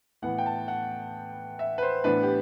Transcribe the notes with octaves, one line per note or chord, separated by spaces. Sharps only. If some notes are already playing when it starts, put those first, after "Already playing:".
A2 E3 B3 F#5
G5
A5
F#5
E5
B4
C5
A2 E3 B3 D4 B4
G4